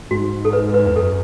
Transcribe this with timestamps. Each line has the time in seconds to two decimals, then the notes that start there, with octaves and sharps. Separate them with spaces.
0.11 G#2 F#4
0.45 A4
0.53 B4
0.74 B4
0.86 E2 B4
0.96 F#2 A4